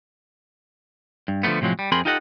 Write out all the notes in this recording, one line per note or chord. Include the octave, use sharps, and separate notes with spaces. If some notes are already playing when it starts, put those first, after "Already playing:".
G2
D3 F3 F#3 A3 B3
A2 C3 F3 F#3 G#3
G3
F2 C4 G#4 A#4 B5 C6
D#4 F4 G4 A4 D#5 F#5